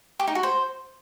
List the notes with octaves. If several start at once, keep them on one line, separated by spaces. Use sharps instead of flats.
G4
D#4
F#4
C5